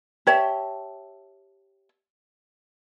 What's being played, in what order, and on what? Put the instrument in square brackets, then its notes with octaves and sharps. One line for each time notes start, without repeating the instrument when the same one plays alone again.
[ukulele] G4 C#5 E5 A5